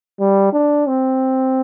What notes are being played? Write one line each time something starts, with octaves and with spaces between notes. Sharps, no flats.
G3
D4
C4